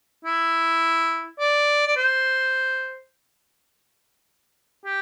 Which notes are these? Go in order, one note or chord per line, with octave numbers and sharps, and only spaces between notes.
E4
D5
D5
C5
G4